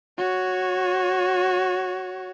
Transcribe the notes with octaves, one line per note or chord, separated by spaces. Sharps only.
F#4 C#5